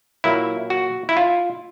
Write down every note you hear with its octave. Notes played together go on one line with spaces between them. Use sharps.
A#2 F#3 A#3 E4
F#4
E4
F4